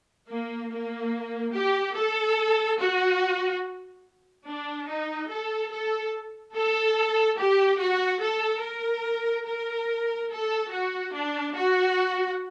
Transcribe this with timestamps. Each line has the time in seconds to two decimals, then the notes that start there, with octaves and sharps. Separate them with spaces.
0.31 A#3
0.72 A#3
1.55 G4
1.97 A4
2.81 F#4
4.47 D4
4.89 D#4
5.30 A4
5.73 A4
6.55 A4
7.39 G4
7.80 F#4
8.22 A4
8.64 A#4
9.46 A#4
10.30 A4
10.72 F#4
11.14 D4
11.55 F#4